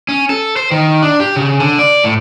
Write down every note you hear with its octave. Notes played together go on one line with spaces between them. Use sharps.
C#4
A4
C5
D#3
D4
G4
C#3
D3
D5
A2